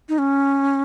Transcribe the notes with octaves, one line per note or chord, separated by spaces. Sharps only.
D#4
C#4